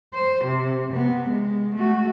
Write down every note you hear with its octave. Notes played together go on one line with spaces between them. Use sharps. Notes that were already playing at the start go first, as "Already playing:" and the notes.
C5
C3
C3 B3
G#3
A3 F#4